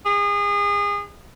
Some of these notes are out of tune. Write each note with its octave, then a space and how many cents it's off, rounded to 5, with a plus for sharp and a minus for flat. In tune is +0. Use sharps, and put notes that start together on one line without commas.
G#4 -30